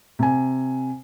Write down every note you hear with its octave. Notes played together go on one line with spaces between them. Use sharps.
C3 G#5